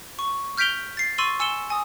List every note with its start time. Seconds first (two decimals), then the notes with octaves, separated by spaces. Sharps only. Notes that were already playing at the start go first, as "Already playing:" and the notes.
0.19 C#6
0.57 F6 G6 B6 D7 F7 G7
0.97 A6 C7
1.18 C6 C#6 E6 A6 D#7 F#7
1.40 G#5 E6 C#7 E7 G7
1.70 G#5 D#6